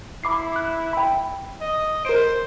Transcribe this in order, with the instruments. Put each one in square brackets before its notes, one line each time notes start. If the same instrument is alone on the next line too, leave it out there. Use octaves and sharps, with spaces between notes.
[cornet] E4 [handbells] B5 D6 C7
[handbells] F#6
G5 B5
[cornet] D#5
[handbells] A#4 D7 [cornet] C5